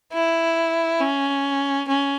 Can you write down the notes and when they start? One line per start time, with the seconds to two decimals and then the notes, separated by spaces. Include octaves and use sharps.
0.13 E4
1.00 C#4
1.88 C#4